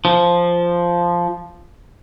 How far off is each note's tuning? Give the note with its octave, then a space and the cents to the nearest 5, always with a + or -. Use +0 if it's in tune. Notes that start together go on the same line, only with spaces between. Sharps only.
F3 -5